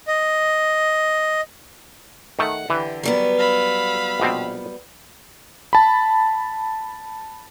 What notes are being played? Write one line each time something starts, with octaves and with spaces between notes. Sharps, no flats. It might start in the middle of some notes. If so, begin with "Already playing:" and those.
D#5
D#3 A3 F#5
D3 E3 G4
F#3 G3 B3 A#4
F5 B5 E6
A#1 B2 C4
A5 B5